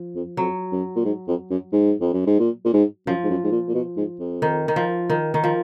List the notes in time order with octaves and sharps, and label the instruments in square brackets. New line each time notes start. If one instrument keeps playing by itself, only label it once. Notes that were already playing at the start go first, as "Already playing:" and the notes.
Already playing: [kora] F3
[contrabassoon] F2
[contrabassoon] F2 [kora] F#3
[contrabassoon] F#2
A#2
G#2
F2
F#2
G#2
F2
F#2
G#2
A#2
A#2
G#2
[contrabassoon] F#2 [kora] F3
[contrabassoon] G#2
F#2
G#2
A#2
A#2
B2
G#2
F2
[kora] D#3
D#3
F3
D#3
D#3
F3